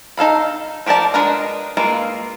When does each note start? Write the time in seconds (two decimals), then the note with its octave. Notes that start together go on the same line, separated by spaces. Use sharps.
0.17 D#4 A4 F5 B5
0.86 F3 G4 A#4 D5 A5
1.14 G#3 D4 A#4 B4 D#5
1.77 E3 G#3 A#3 F4